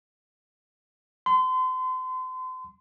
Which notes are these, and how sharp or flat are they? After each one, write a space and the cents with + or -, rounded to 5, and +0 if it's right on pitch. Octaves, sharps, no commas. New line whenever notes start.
C6 -35